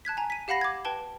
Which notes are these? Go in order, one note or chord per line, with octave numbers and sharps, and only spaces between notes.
A5 F#6 G#6 B6
G#5 A#5
B6 D#7
G4 F5 F#5 B5 A#6 C7
D6 G#6
B4 G5 A5 G7